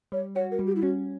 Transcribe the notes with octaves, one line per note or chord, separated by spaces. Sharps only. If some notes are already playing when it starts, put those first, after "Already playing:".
G3 C#5
F#4 C#5
A#4
G3
G4
E4
C#4 F#4